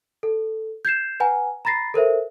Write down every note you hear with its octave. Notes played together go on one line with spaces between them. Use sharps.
A4
G6 G#6 C7 E7
B4 F#5 G#5 A#5
A#5 B5 A6 A#6 C7
A4 A#4 C5 E5